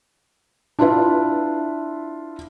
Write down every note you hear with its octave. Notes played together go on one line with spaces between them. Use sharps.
D4 E4 F4 B4 E5